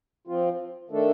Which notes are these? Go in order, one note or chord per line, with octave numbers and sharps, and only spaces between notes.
F3 C4 F4
D#3 A3 D4 A4